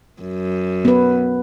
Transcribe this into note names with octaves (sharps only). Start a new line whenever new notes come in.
F#2
B3 B4